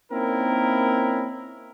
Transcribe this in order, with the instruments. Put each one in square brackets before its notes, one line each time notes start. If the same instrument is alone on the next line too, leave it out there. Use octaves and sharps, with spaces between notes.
[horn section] A#3 C4 C#4 D#4 E4 A#4